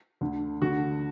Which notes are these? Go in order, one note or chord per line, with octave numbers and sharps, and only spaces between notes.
D2 D3
D2 D3 F#4